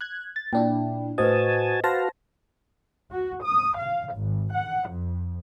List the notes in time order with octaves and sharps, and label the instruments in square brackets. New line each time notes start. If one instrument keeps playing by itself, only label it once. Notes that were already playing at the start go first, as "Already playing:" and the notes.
[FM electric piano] F#6 G#6
A6
[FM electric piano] A#2 D4 E4 [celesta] G5
[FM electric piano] A2 D#5 [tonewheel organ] F#4 G#5 A5 [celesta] B4 C5
[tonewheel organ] F#4 B4 F5 [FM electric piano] C5 A5 A#6
[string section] F#4
D#6
F5
G#1
F#5
F2